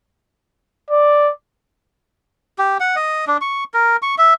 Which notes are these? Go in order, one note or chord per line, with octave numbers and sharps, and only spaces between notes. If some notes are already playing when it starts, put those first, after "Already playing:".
D5
G4
F#5
D#5
D4
C#6
A#4
C#6
E5